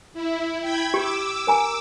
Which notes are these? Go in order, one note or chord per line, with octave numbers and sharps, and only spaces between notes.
E4
G5 B5 G#6
G4 D6 E6
A#4 G#5 A#5